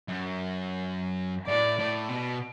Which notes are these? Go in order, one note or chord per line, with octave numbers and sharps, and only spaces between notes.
F#2
A2 D5
A2
B2